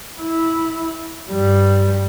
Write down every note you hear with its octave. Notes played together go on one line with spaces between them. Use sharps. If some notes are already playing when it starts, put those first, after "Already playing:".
E4
G2 G3